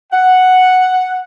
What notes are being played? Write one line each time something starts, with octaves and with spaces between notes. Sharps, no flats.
F#5